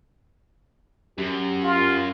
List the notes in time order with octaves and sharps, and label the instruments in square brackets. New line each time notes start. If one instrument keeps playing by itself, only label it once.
[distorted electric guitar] F#2 [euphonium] G4
[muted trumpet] F4